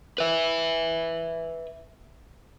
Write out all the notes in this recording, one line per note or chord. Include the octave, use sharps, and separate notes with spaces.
B4 E5